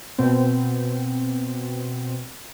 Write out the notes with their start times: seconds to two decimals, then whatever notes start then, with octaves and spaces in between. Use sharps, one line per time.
0.18 B2 C4